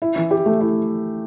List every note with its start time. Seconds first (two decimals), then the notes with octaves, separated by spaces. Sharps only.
0.02 E4
0.16 E3
0.31 G4
0.46 A3
0.61 E4